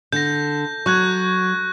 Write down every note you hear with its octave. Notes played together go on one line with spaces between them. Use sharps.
D3 G6 A#6
F#3 C#6 F#6 G#6